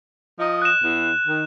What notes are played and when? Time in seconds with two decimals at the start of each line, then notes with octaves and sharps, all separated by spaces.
0.40 F3 D#5
0.62 F#6 E7
0.83 E2
1.27 D#3